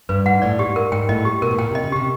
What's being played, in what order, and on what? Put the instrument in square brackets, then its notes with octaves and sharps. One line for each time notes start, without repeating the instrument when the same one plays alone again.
[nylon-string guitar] G2 [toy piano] B4
[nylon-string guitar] G#2 [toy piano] F#5
[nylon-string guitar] A2 [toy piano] D5
[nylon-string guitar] G#2 [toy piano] G4
[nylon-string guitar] G#2 [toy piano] A#4
[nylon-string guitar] G#2 [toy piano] G5
[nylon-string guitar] A2 [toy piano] D#5
[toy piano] G4
[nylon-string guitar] B2 [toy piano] A#4
[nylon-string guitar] A2
[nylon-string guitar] A#2 [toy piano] G5
[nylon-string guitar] C3 [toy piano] D#5
[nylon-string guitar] C#3
[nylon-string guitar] C3 [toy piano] G4